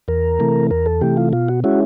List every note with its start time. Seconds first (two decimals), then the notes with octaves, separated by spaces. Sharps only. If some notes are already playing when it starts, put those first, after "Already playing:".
0.08 E2 A#4
0.40 C3 E3 A3
0.71 E2 A#4
0.86 A4
1.01 C3 E3 A3 G4
1.17 F4
1.33 B2 F4
1.48 F#4
1.64 G#3 C#4 E4 F#4